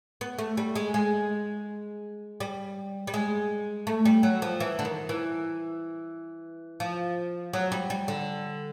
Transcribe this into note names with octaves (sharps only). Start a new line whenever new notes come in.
B3
A3
G3
G#3
G#3
G3
G3
G#3
A3
G3
F#3
F3
E3
D3
D#3
E3
F3
F#3
G3
G3
D3